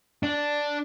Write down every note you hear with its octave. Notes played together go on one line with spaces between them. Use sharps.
D4